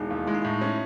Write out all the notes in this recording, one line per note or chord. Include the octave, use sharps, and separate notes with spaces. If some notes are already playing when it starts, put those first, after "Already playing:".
Already playing: E1 D#4 E4
D#2
G#3 E4
D#4
A2 E4
C#4